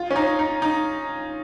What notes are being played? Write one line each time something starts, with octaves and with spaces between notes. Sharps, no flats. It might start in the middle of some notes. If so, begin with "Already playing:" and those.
Already playing: F4
C#4
D#4
D#4
D#4